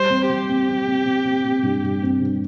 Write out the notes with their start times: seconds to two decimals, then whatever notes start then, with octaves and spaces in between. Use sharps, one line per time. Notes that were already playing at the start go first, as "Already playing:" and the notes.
Already playing: G3 C5
0.10 C4
0.29 G3 G4
0.49 C4
0.69 C4
0.88 C4
1.06 C4
1.26 C4
1.45 C4
1.63 G2
1.84 G2
2.03 C4
2.22 G2